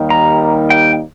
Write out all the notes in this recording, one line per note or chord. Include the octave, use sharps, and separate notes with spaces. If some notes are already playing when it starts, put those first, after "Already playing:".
Already playing: D#2 D#3 G3 A#3 D#4
A#5
G5